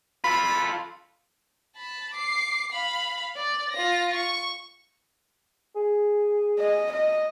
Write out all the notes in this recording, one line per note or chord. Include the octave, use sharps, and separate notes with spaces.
F4 A4 B5
A5 B5
D6 C7
F5 B5
D5
F4 A#6
C#6
G#4
D#5
D#5